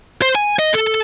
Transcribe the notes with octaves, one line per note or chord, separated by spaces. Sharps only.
C5
G#5
D#5
A4